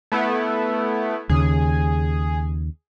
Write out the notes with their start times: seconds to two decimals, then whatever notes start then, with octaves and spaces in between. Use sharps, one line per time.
0.12 A3 B3 E4
1.29 D#2 C#3 G#4